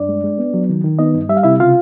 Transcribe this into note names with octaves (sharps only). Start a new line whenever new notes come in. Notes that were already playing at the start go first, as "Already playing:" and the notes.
Already playing: G2 D4 D5
G#3
G#3
B3
F#3
D#3
D#3
B3 D#4 D#5
G2
G3 E5
F5
C3 E4 E5
C#3 F4 F5